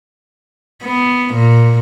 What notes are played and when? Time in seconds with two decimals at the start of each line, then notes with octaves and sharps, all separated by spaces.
0.83 B3
1.34 A#2